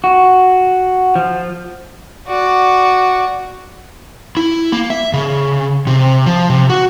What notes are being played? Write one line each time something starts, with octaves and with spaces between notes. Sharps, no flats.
F#4
F3
F#4 D5
E4
A#3
E5
C#3
C3
F3
C3
F#4